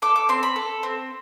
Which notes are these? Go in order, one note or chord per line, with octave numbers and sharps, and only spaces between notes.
A4 D6
D6
C4 C6
B5
A4
C4